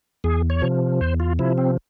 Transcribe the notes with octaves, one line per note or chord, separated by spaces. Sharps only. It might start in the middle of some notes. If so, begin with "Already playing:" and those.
E2 G#4
C#5
C3 F3
E2 C5
F4
C3 F3 E4
C4